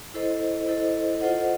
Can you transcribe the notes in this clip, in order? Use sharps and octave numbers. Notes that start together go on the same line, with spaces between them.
E4 A4 C5 D#5
E4 A4 C5 D#5
F4 A4 C5 D#5 F#5